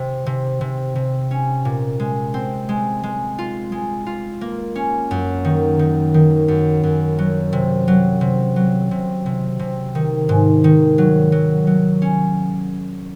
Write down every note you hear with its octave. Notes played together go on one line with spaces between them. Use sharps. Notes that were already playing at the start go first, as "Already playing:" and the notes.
Already playing: C3
C3
C3
C3
C#4
A#2
G#3
C4
G#3
G#3
F4
G#3
F4
A#3
C#4
F#2
D#3
D#3
D#3
F#2
F#2
F#3
C3
F#3
C3
F#3
C3
C3
C3
D#3
G#2
D#3
F#3
F#3
F#3
C#4